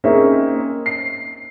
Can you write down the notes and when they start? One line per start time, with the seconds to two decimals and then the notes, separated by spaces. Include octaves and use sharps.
0.04 A#3 C4 C#4 D#4 G#4 E5
0.86 C7